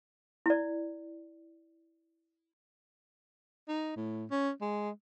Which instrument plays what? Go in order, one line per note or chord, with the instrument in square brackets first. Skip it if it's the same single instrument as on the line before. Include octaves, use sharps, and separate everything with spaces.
[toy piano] E4 D5
[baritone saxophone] D#4
A2
C#4
G#3